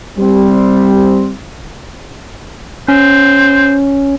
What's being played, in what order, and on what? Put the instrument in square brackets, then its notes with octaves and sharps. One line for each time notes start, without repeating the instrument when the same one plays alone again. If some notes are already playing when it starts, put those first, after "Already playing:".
[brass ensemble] G3 C4
[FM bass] C#4 [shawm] C5